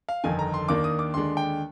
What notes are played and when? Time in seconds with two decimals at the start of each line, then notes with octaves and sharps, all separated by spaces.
0.09 F5
0.24 G1 F2 D#3 G#5
0.39 A#5
0.54 C6
0.68 D#2 D#3 A#3 D4 D6
0.84 D#6
0.99 D6
1.14 D#2 D3 G#3 D4 C6
1.37 G5